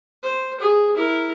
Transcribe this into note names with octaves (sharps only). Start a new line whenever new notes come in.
C5
G#4
E4 A#4